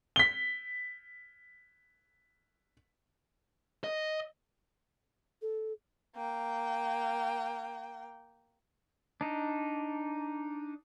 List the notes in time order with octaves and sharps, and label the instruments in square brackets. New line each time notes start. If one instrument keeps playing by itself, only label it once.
[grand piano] B6 G7
[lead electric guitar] D#5
[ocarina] A4
[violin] A#3 G5
[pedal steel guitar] D4 D#4